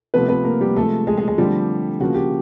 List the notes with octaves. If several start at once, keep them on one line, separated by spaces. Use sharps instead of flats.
C3 F3 A3 B3 B4
B3 B4
A#3 A#4
G3 G4
C3 F3 G#3 A3 A4
G#3 G#4
G#3 G#4
G#3 G#4
D3 F3 G3 A3 C4 G4
C#3 F3 A#3 F#4
G4